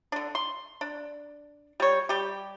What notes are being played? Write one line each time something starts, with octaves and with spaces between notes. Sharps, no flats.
D3 D4
C6
D4
G3 C#5
G3 G4